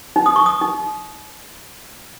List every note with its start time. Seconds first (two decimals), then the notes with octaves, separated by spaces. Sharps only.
0.16 D#4
0.26 D#6
0.36 C#6
0.46 D#6
0.61 D#4